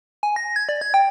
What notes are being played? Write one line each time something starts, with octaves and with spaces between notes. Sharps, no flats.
G#5
A#6
G#6
D5
G#6
G5